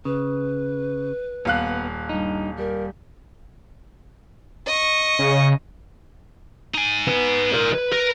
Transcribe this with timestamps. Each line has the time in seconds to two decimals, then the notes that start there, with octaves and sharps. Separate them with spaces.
0.05 C#3 B4
1.45 D#1 B3 F5 F#6
2.09 G2 D#4
2.58 G3 A#4
4.67 D#5 C#6
5.19 C#3
6.74 D#4 G#5
7.07 B3 B4
7.54 A#4 D5
7.73 B4
7.93 A#4 B4